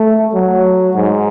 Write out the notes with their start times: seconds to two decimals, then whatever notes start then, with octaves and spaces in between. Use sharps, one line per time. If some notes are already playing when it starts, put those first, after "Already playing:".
Already playing: A3
0.34 F#3
0.96 G#2